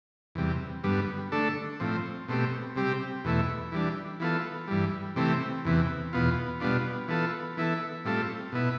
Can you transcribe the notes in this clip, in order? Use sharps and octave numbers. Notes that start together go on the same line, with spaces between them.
E2 C3 G3
G2 D3 G3 B3
D3 A3 D4 A4
A2 F3 C4
B2 A3 C4 G4
C3 G3 C4 G4
E2 B2 A3 E4
E3 G3 D4
E3 B3 F4 A4
G2 E3 G3
C3 E3 A3 C4 G4
E2 C3 E3 B3
E2 B2 B3 F4
B2 G3 B3 D4 F4
E3 B3 F4 A4
E3 B3 E4 A4
A2 G3 C4 F4 A4
B2 B3 E4